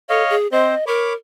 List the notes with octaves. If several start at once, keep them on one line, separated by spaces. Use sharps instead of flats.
A4 C#5 D#5 F5
G#4
C4 C5 D#5
A#4 C#5 B5 D6